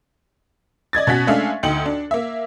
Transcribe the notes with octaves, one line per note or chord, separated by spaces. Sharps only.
D5 D#5 G#6 A6
B2 C#4 F#4 B6
G#3 A3 C#4 D4 E5 F5
D2 D#4 G5 C#7 F#7
D4
A#3 E5